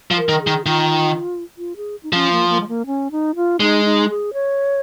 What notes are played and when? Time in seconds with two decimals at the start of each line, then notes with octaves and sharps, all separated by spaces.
0.11 F3
0.17 A#4
0.29 D#3
0.42 G#4
0.47 D#3
0.66 D#3 F4
1.58 F4
1.76 G#4
2.03 D#4
2.13 F3 C#4
2.32 A#3
2.49 A#3
2.60 G#3
2.68 A#3
2.86 C#4
3.11 D#4
3.36 F4
3.60 G#3 D#4
3.85 D#4
4.09 G#4
4.33 C#5